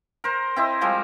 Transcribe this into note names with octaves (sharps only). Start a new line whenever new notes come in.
A#4 C5
C4 E4 D#5
F3 G3 G#3